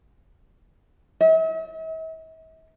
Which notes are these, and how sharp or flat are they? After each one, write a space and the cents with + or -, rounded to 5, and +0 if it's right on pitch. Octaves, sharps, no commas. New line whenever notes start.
E5 -45